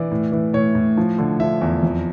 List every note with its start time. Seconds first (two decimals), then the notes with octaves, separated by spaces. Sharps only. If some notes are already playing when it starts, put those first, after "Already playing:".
Already playing: E3 D5
0.11 A2
0.32 E3
0.54 A2 C#5
0.75 A2
0.97 F3
1.18 D3
1.40 F3 E5
1.61 E2
1.83 F2